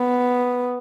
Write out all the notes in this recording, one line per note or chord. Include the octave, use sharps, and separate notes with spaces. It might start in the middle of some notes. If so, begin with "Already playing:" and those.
Already playing: B3